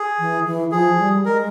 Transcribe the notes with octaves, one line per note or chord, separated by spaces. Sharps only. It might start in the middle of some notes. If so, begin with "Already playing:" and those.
Already playing: G#4
E3
E3
F3 G#4
G3
G#3 A#4